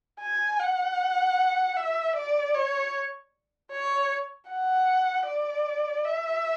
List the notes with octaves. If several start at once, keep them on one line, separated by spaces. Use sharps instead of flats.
G#5
F#5
E5
D5
C#5
C#5
F#5
D5
E5